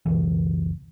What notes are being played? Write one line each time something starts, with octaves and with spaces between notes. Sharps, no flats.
F#1 C#2 B2 E3